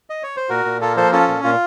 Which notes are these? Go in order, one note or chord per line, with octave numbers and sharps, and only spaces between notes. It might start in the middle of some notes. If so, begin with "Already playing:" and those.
D#5
C#5
C5
A#2 F#4 A#4
A#2
A#3 F4 A4
F3 A4 C5
C#4 F4 A4
A#2
A#2 F4